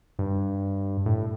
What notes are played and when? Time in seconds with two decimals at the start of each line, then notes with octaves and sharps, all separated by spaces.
0.19 G2
1.06 A2